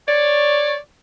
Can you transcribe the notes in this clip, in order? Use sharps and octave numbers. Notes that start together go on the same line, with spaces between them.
C#5 D5